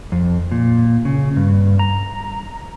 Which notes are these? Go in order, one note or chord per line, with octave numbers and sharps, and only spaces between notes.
F2
A#2
C#3
G2
A#5